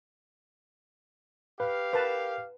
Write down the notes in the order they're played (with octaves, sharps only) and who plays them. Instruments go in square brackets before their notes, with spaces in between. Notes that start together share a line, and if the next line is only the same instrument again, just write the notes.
[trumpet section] G4 F5 [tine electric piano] B4
[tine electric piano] A#4 [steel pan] B4 A5